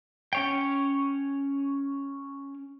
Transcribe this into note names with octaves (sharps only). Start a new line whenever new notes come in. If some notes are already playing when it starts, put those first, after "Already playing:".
C#4 C#5 G5